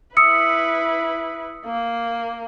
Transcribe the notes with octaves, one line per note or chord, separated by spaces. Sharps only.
E4 B4 D#6 E6 C#7
A#3